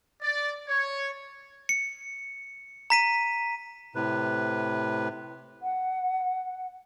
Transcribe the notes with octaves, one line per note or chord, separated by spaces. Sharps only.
D5
C#5
C#7
A#5 B6 D#7
A2 C3 B4
F#5